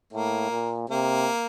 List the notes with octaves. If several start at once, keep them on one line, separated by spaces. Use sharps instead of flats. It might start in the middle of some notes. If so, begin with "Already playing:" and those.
A2 A#3
A#2
C3 A#3